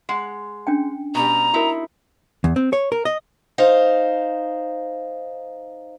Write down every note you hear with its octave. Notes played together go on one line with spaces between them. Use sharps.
G#3 F#5
C#4 D4 G5
B2 G3 A#5
D#4 E4 F#4 A#4
E2
C4
C#5
A#4
D#5
D#4 C5 F5